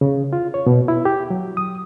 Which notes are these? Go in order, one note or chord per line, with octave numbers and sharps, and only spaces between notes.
C#3
F4
C#5
B2
E4
G4
F#3
D#6